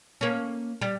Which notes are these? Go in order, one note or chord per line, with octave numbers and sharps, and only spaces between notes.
A#3 C#4
G3